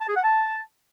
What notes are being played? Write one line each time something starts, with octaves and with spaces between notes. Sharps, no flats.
A5
G#4
F#5
A5